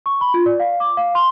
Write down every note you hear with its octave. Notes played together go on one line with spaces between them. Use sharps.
C#6
B5
F4
D5
F5
D6
F5
C6